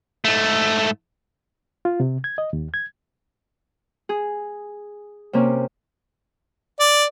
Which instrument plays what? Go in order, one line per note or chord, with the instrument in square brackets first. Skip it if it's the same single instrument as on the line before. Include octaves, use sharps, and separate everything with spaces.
[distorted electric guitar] G#2 A3
[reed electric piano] F4
C3
G#6
D#5
D#2
G#6
[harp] G#4
C3 A#3 C4 C#4
[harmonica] D5